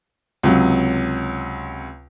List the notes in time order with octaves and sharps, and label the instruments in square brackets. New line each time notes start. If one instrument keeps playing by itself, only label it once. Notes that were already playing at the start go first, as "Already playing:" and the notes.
[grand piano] C#2 C3 F#3